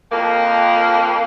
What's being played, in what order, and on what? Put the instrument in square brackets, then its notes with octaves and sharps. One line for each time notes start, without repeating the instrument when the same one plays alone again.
[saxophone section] F2 A#3